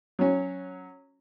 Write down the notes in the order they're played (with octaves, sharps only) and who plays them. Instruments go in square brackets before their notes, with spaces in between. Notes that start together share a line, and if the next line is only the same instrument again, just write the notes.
[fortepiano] F#3 C#4